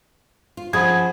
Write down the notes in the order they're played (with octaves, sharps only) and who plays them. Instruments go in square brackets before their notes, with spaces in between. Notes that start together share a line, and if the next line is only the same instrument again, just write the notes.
[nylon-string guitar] F4
[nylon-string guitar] F3 C#4 G#4 [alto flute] F#5 [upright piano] B5 D#6 G#6